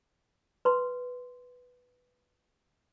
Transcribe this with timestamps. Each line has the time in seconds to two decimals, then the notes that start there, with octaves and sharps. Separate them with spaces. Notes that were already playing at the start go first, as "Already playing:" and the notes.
0.65 B4 C6